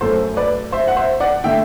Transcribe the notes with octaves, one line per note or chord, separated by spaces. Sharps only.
F#2 F#3 A3 A4 C5
B4 D5
C5 E5
F#5
C5 E5
D5 F#5
D3 A3 E5 G5